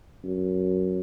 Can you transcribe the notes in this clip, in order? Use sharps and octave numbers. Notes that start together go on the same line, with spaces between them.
F#2